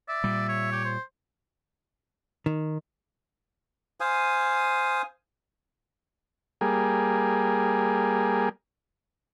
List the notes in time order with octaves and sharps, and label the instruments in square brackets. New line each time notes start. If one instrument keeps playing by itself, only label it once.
[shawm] D5 [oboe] E5
[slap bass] A#2 G3
[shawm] C#5
[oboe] G4
C5
[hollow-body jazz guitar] D#3
[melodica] C5 F5 G#5 D#6
[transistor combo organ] G3 A#3 G#4